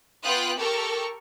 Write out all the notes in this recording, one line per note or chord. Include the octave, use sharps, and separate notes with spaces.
B3 F4 G5 D#6 F#6
G4 A4 A#4 C#6